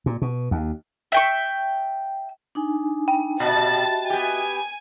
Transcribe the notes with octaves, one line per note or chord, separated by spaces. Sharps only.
A#2
B2
D#2
E5 G5 C#6
D4 D#4 G#5
G5
A#2 F#4 D#5 E5 A5 A6
B3 G4 G#5